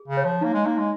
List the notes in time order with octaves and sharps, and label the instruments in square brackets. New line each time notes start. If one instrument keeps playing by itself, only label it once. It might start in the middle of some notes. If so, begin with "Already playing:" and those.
Already playing: [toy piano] G#4
[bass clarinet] C#3
[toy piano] C#5
[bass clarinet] F3
[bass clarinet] A#3 [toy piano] D#4
[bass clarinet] G#3
[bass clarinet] A#3 [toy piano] D#4
[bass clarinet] G#3